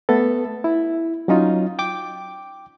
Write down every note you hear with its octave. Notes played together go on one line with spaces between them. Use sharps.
A3 B3 A4
E4
F#3 C#4 D#4 F4
G5 D6